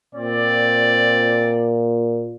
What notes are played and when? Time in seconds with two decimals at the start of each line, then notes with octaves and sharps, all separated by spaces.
0.15 A#2 C4 D5